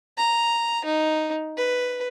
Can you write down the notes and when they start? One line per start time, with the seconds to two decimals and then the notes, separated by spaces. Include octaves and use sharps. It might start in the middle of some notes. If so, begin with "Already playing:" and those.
0.18 A#5
0.85 D#4
1.57 B4